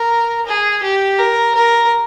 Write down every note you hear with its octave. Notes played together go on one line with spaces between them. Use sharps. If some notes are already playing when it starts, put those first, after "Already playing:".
Already playing: A#4
G#4
G4
A#4
A#4